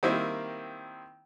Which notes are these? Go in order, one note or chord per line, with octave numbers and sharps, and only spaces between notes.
D#3 G3 A#3 C4 E4